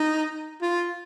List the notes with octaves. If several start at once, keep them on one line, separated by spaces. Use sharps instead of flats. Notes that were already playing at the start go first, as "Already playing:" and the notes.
Already playing: D#4
F4